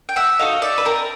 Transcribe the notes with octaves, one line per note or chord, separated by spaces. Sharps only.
G5
E5 F#5
D#4 F#4 A4 D#5 F5
D5 E5
B4
C4 A#4